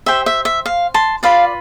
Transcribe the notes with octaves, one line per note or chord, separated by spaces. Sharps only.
G4 C5 E5 G5
E5
E5
F5
A5 C6
F4 B4 D5 F5